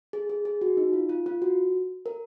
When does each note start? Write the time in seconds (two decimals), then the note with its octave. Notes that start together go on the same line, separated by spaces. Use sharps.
0.13 G#4
0.30 G#4
0.45 G#4
0.61 F#4
0.77 D#4
0.93 F4
1.09 F4
1.26 F4
1.42 F#4
2.06 A#4